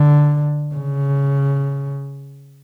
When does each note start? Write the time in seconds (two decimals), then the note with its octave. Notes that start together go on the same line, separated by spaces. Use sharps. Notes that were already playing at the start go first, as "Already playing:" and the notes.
Already playing: D3
0.75 C#3